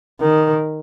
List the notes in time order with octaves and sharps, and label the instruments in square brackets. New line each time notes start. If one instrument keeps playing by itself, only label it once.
[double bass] D#3